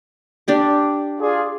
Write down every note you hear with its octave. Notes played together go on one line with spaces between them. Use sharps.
D4 G4 D6
F4 G#4 D5